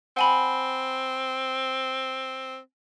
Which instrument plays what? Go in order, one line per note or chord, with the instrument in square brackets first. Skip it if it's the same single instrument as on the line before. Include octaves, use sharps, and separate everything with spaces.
[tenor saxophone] C4 [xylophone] F#5 G#5 B5